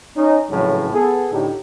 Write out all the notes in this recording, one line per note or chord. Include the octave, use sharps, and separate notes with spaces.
C#4 D#4
A#1 F2 A2 C#3 E3 F#3
B3 G#4 A4
A2 D3 D#4 G4